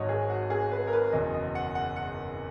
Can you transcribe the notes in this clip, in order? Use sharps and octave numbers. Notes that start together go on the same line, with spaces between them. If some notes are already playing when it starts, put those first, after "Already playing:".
Already playing: G#1 G#2 F#3 C#5 D#5
G#4
F#4
G#4
B4
A#4
B4
F#1 E2 B2 D#5
D#5
F#5
F#5
F#5